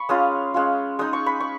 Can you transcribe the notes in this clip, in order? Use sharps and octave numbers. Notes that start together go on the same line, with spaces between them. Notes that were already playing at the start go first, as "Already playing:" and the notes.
Already playing: B5 C#6
G#3 C#4 F4 D#6
G#3 C#4 F4
G#3 D#4 D#6
C#6
B5
C#6